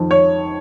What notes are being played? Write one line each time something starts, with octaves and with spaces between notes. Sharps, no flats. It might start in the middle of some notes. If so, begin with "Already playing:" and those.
Already playing: F2 D#3
C#5